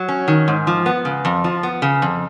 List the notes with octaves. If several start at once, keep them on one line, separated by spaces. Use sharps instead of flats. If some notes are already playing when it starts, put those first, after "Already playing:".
Already playing: F#3
C#4
D#3
G#2
F3
B3
C#3
F2
F3
B3
C#3
F2